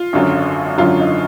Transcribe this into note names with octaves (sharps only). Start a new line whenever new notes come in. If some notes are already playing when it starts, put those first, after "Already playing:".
Already playing: F4
G#1 F#2 D3 F#3
G#1 F#2 D3 F#3 F4
D#4